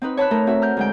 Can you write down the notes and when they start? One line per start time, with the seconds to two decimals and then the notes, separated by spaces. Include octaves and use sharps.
0.02 C4 D#4 B4
0.17 C#5 A5 B5 F#6
0.31 A3 D#4 A#4
0.47 C4 F#4 E5
0.61 A#5 F6 G6
0.77 D2 G#3 G5